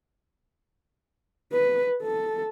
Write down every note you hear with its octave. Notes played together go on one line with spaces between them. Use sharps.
B4
A4